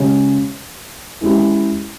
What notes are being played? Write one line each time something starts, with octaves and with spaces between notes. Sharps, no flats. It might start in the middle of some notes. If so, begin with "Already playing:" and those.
Already playing: C#3 G#3 C#4 G4
E3 G#3 C#4 E4 G4